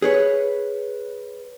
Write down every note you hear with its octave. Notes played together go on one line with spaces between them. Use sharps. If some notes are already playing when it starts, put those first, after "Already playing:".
G#4 B4 C#5